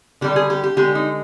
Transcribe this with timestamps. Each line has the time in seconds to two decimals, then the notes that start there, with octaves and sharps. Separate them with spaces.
0.21 D3 G3 G4
0.36 G#4
0.50 G4
0.64 G4
0.77 D3 G#3 G4
0.95 D#4